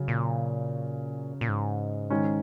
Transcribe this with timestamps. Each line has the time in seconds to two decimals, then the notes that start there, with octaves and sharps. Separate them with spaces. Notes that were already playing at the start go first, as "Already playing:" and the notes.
Already playing: C#3 F#3 C#4
0.08 A#2
1.41 A#2
1.49 G#2
2.10 D#3 G#3 C#4